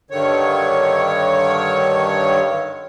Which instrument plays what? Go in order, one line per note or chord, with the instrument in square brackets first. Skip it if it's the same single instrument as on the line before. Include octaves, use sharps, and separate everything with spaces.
[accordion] G2 D3 D#3 C#5